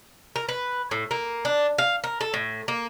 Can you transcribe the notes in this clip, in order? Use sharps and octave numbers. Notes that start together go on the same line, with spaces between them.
A#4
B4
A2
A#3
D4
F5
A#4
A4
A2
A#3